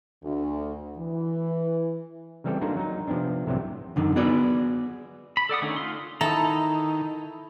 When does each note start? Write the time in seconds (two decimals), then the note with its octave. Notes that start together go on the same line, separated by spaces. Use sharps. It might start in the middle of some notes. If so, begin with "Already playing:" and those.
0.23 D2
0.98 E3
2.44 C#3 E3 G3 C4 A4 G5
2.61 A#3 D4 D#4 F#4 A4 C5
2.76 F#3 D#4
3.07 C3 F3 B3 C4 D4
3.46 C2 A2 C3 E3 F#3 G5
3.96 F#2 D3 D#3
4.16 B3 F#4 G#4 D5
5.37 B5
5.49 A4 D5 F#5 D#6
5.61 D3 D#3 A3 C#4 D#4
5.76 F4 C6
6.21 D#3 E4 A4 A#5 D#6